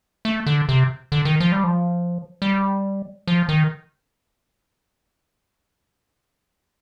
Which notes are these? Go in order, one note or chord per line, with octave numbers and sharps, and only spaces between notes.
A3
D3
C3
D3
D#3
F3
G3
F3
G3
F3
D#3